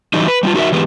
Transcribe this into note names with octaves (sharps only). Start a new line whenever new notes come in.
E3 F#3 G3 D#4
B4
G3 D4 F4
D#4 F#4 G#4 A#4 E5
E3 G#3 B3 G4